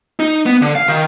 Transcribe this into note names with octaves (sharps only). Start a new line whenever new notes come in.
D#4
B3
D3
F5
D#3